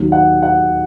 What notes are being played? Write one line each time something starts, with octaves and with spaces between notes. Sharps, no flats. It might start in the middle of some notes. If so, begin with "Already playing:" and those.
Already playing: D#2 D#3 F#3
F#5
F#5